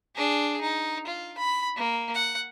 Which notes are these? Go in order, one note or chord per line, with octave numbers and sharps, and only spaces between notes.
D4 G#4
D#4
F4
B5
A#3
F#5